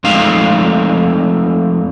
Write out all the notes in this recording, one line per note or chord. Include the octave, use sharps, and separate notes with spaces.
F2 G#3 A3 D#4 F5